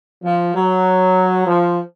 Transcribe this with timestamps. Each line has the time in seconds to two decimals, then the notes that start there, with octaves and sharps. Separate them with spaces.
0.24 F3
0.55 F#3
1.47 F3